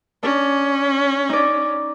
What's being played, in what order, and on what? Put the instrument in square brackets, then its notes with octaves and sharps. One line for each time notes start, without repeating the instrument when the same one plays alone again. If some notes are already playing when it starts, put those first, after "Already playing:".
[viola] C#4 [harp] D4
[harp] D#4 D5